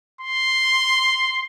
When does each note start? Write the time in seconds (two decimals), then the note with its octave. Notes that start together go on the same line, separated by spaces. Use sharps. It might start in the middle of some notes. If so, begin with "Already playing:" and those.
0.21 C6